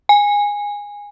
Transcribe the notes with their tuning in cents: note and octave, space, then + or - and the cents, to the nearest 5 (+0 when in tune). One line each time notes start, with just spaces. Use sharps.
G#5 -15